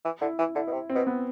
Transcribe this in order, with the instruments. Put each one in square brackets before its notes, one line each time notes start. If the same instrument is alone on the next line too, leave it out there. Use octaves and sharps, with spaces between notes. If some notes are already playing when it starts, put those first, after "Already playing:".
[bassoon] E3
[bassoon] D3 [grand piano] E4
[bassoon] E3 [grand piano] E4
[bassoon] D3 [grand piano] E4
[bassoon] B2
C3
[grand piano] C4
[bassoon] B2
[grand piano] B3